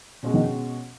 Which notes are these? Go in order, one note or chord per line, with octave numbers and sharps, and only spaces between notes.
B2 G#3 C#4 F#4
D#3